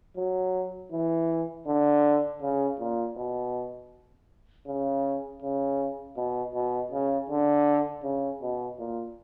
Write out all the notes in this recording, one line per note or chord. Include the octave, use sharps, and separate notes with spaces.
F#3
E3
D3
C#3
A#2
B2
C#3
C#3
B2
B2
C#3
D3
C#3
B2
A#2